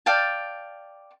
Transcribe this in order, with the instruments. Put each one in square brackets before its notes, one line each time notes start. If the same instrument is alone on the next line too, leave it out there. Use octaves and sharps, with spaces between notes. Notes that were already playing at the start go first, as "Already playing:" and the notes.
[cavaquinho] D5 F5 G5 A5